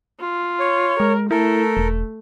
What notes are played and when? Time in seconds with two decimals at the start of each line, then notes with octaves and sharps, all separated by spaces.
0.21 F4
0.59 C#5
1.00 G#3 A#4
1.31 A3 E4 A4 A#4
1.77 E1